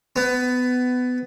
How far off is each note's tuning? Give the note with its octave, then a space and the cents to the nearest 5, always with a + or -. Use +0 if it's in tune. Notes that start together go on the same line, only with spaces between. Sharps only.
B3 +20